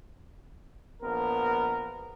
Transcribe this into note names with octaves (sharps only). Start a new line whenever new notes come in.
A#1 B3 A#4